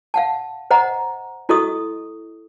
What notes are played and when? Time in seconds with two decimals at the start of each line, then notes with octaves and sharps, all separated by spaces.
0.14 F5 F#5 A5
0.71 C5 D#5 F#5 A#5
1.49 E4 F#4 A4 D#5 C#6 D#6